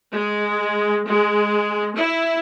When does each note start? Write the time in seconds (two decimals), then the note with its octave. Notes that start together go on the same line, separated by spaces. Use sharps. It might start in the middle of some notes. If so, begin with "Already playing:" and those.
0.12 G#3
1.06 G#3
1.96 E4